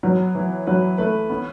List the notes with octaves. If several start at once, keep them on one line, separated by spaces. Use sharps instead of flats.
F#3 B3
E3
F#3 B4
A3 B4
B3 C#4